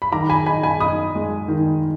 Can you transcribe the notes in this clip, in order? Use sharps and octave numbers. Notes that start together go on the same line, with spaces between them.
B5
D#3 A#5 D6
G#5 B5
D#4 G#5 B5
G#5 B5
D#4 B5 D#6
G#3
D#3